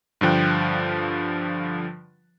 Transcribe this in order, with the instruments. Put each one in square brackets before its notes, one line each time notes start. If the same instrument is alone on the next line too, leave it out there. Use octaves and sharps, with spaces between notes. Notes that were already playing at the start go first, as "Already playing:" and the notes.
[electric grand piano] G2 D3 F3 G5 F#6